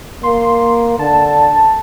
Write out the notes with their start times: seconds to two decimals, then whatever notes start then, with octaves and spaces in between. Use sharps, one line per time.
0.23 A#3 C6
0.99 D3 A5